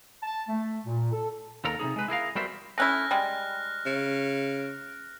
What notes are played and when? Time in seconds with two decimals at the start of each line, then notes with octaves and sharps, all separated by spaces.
0.23 A5
0.49 A3
0.87 A#2
1.13 A4
1.65 D#2 A4 A#4 A#5
1.79 C3 F#3 D#4 G#4
1.96 G#3 B4
2.08 E4 G#4 A#4 F5
2.35 G3 B3 F#4 A#4 C5 E5
2.78 A3 C#4 E4 F6 F#6 A#6
3.11 G3 G#3
3.86 C#3